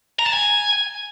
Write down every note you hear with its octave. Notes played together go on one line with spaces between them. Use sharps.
A#5
A5
G#5